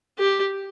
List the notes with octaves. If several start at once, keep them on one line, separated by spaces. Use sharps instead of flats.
G4